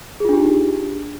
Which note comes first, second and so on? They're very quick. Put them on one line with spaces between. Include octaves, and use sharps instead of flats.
G#4 F4 D4 G4 D#4